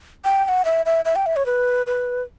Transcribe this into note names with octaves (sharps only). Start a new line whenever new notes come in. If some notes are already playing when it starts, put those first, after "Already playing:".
G5
G5
F#5
E5
E5
E5
G5
E5
C#5
B4
B4